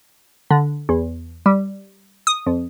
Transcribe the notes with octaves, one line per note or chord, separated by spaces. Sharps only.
D3
E2
G3
D#6
F2